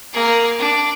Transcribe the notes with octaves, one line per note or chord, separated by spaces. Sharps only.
A#3 G#4
D4